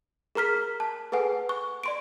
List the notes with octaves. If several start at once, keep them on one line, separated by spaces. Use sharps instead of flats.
G#4 A#4 A#5 F6 B6
A5
G#4 A4 B4 F#5 G#5
C#6
D5 C6 D7